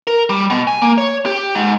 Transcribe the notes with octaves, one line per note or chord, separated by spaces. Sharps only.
A#4
G3
B2
G#5
A#3
C#5
G4
G#2